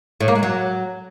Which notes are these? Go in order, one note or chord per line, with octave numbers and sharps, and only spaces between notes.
A2
A#3
G#3
F#3